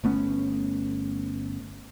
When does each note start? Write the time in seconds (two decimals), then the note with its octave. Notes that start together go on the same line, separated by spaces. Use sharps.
0.04 G1 A3 B3 C#4